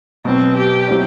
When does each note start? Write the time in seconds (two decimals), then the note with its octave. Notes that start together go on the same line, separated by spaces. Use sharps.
0.25 B2 F#3 B3 C4
0.57 G4
0.88 F#3 C4 E4 G4 D5